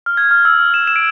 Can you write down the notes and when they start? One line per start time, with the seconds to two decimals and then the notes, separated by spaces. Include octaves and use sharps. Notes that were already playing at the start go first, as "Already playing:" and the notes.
0.06 F6
0.17 G#6
0.31 F6
0.45 E6
0.59 F6
0.74 E7
0.87 E7
0.96 D7